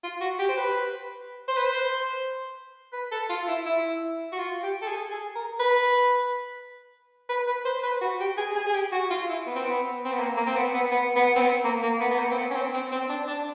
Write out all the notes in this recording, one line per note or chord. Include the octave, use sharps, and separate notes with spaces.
F4
F#4
G4
C5
B4
C5
B4
C5
B4
A4
F4
E4
E4
F#4
F4
G4
A4
G#4
G#4
A#4
B4
B4
B4
C5
B4
F#4
G4
G#4
G#4
G#4
G4
F#4
F4
E4
B3
C4
B3
C4
B3
A#3
A#3
C4
B3
B3
B3
B3
C4
B3
A#3
A#3
B3
B3
A#3
C4
B3
C#4
C4
C4
C4
D4
D4